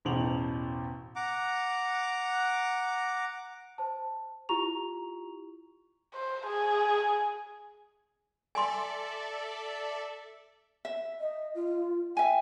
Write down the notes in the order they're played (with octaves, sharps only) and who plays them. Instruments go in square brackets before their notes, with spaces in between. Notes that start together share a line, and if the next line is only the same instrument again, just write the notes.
[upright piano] A1 E2 B2 C5 F7 F#7
[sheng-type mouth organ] F#5 A#5 D6
[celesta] C5 A5
E4 F4 G4 A#5 C#6 F7
[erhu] C5
G#4
[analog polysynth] A4 D5 E5 [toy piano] G#5 C6
[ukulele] E5
[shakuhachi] D#5
F4
[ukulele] E5 G#5 [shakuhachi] G5